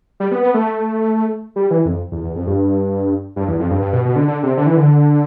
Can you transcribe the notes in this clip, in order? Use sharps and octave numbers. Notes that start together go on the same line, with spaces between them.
G3
B3
B3
A3
G3
E3
F2
E2
E2
F2
G2
G2
E2
F2
G2
G2
B2
B2
D3
D3
C3
D3
E3
D3